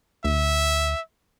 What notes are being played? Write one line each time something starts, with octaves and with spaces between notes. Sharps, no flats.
D2 E5